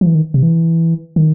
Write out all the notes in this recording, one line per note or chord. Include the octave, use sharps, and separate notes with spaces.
F3
E3
D#3
C3
E3
D#3